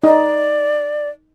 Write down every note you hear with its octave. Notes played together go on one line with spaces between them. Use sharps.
D#4 D5 D#5